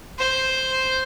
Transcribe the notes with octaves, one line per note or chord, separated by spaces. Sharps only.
C5